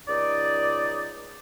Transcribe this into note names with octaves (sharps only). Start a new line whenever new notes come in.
C#2 D#4 D5